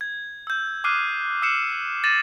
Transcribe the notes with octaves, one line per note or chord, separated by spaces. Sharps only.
G#6
E6 G6
D6 D#6 F6 F#6 C7 D#7
E6 F6 C7 C#7 E7
D6 A6 A#6 D#7 E7 F#7